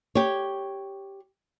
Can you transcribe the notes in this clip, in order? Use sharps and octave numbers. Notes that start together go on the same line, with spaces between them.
G4 C#5